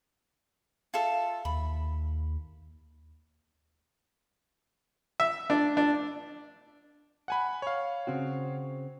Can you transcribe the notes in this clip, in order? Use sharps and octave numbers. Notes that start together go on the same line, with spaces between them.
F4 A4 E5
D#2 B5
E5
D4
D4
F#5 G#5 B5
C#5 F5
C#3 C4 F#4